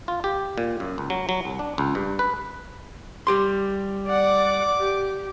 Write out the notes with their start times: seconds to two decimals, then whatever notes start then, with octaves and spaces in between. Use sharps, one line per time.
0.08 F4
0.24 G4
0.58 A#2
0.80 F#2
0.98 C#2
1.10 F#3
1.29 F#3
1.45 C2
1.59 D4
1.78 C#2
1.95 G2
2.19 B4
3.27 G3 G4 C6
4.07 D5 F#5 D6
4.79 G4